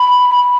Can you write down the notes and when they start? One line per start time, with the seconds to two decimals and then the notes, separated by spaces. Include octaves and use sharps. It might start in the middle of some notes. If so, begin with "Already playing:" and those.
Already playing: B5
0.30 B5